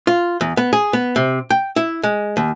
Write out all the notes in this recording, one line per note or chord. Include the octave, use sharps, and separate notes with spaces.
F4
E2
B3
G#4
B3
C3
G5
E4
G#3
D#2